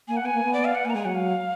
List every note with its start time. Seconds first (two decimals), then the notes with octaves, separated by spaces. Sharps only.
0.08 A#3 G#5
0.17 F#5
0.23 B3 G#5
0.34 A#3
0.44 B3
0.53 D5
0.65 F5
0.75 F#5
0.84 A#3 G#5
0.90 A#5
0.95 G#3 G#5
1.05 F#3 F#5
1.15 F5